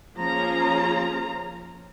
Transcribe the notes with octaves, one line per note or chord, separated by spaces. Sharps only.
F3 A#3 C#4 F4 G#4 A#5